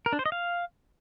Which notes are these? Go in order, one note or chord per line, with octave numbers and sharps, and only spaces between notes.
A#4
D4
C5
D#5
F5